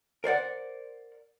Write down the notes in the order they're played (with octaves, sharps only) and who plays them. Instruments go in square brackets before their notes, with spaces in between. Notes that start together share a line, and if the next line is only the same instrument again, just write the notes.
[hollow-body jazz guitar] A#4 C5 D5 F#5